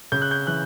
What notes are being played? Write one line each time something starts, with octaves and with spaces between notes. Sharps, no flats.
C#3 G6
F#6
G6
E3 F#6